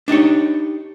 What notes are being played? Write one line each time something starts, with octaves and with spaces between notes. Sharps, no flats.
D4 D#4 G4 C#5